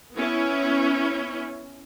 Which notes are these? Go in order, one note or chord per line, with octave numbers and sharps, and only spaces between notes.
B3 C#4 E4